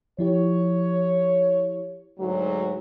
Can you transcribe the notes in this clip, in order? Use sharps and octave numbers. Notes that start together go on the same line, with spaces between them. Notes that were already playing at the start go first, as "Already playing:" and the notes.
F3 E4 G4 C#5
D2 G#2 F#3